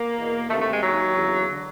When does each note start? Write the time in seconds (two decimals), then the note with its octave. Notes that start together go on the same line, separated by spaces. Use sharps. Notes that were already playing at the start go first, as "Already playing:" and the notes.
Already playing: A#3
0.16 E2 B2
0.49 D2 C3 D#3 A3
0.60 A3
0.72 G#3
0.82 D#2 D#3 F#3
1.16 E2 C#3 E3
1.49 D3